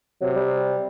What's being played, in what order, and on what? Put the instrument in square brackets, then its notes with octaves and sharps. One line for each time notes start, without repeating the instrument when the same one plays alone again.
[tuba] C3 [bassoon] F#3
[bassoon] G3